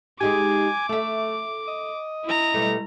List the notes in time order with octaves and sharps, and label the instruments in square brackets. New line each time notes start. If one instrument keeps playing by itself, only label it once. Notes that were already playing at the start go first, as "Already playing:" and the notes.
[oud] G#3 D#4 G4 [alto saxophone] G#5 [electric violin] D6
[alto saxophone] A3 [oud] A4 E5
[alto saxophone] D#5
[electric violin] E4 A#5
[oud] B2 G3 A3